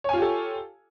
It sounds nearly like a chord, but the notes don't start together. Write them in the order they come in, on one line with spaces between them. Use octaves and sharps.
C#5 G#5 F4 G4 A4